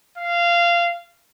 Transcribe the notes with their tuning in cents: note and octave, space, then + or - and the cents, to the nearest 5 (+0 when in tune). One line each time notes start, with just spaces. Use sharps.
F5 -15